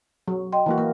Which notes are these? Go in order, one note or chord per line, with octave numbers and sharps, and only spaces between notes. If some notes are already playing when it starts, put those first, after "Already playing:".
F#3
D#5 G5 C6
E3 A#3 F#4
A#3 A#4